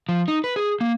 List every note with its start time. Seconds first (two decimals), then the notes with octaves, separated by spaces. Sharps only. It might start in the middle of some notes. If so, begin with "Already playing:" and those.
0.09 F3
0.28 D#4
0.44 B4
0.56 G#4
0.81 A#3